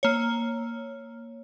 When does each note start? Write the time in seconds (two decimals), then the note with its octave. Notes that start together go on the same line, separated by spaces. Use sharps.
0.03 A#3 C#5